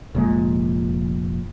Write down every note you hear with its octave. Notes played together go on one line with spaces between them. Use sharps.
F1 A#2 G#3